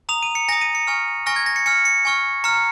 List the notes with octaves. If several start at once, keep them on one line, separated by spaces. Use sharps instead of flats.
A#5 D#6 F7
D#7
C#7
G#5 D#6 A#6
D#7
C#7
G#5 C#6 F6
G#5 C#6 F6 A#6
G#6
A#6
C#7
G#5 F6 C#7
C#7
G#5 C#6 F6
A#5 F6 C#7